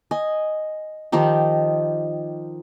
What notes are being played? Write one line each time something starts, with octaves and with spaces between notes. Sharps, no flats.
D#5 G#5
D#3 F3 D#4 G4